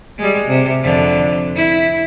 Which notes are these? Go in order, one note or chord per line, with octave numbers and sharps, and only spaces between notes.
G3 G#3
C3
F2 D3
E4